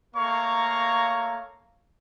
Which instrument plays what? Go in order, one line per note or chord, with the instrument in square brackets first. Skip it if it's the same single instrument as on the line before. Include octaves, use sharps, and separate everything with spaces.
[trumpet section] A3 A#3 C#5 F5 A#5 C#6